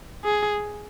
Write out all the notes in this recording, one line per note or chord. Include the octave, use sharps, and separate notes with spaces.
G#4